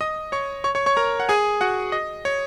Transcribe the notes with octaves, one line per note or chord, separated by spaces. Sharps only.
D#5 D#6
C#5 C#6
C#5 C#6
C#5 C#6
C#5 C#6
A#4 A#5
F#5
G#4 G#5
F#4 F#5
D#5
C#5